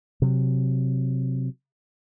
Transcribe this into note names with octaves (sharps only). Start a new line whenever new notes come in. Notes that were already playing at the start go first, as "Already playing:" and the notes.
C3 F#3